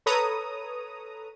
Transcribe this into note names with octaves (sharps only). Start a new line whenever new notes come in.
A4 B4 C#5 A#5 D#6